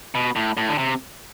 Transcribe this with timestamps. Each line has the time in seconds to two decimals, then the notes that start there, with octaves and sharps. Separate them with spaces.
0.15 B2
0.36 A2
0.57 A2
0.69 D3
0.78 C3